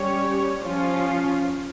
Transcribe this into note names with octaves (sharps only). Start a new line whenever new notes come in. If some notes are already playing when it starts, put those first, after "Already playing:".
Already playing: G3 C#4 G4 C#5
F3 C#4 F4